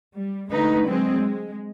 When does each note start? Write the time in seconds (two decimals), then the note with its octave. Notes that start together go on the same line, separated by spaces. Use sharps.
0.15 G3
0.50 D3 G#3 A3 D#4 B4
0.86 F#3 G#3 C4 G#4
1.19 G#3